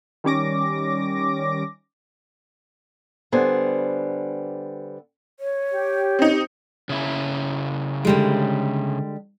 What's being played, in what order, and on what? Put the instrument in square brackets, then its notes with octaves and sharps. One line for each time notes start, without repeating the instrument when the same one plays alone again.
[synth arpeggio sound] D#3 G3 C#4 D6 A#6
[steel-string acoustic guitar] D3 G3 B3 C5 G#5
[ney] C#5
[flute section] G4
[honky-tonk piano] C4 D#4
[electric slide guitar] C#3 E4
[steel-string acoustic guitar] D3 G3 G#3